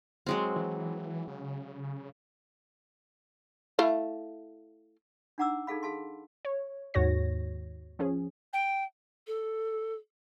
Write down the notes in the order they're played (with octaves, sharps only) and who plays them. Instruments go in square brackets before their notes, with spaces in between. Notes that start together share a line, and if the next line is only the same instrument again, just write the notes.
[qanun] F#3 G#3 C4
[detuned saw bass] E3
C#3
[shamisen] A3 E4 F5
[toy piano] D4 D#4 F#5 A#5 D6 E6
D#4 G#4 A4 F5 B5
G#4 F5 A5 C6
[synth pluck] C#5
D#2 G#2 F#4 C#5 A#6
F3 C#4 G#4
[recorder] G5
[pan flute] A4